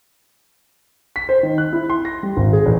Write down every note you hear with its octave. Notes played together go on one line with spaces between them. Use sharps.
B6
C5
D#3
F#6
E4
C6
A#6
G3
G#1
G#4
A1